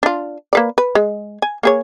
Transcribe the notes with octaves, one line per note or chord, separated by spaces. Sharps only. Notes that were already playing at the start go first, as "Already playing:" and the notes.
D4 F4
A#3 B4 D5
B4
G#3
G#5
A#3 G#4 C#5